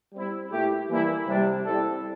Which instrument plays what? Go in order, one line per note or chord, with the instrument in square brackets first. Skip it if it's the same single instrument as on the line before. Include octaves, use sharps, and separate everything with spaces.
[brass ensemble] G3 C4 E4
A#2 A3 E4 G4
E3 G3 A#3 E4
C3 G3 D4
G3 C4 E4 A4